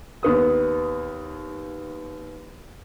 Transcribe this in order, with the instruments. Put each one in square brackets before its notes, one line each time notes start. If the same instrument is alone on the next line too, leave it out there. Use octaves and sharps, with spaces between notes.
[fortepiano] D#2 B3 D#6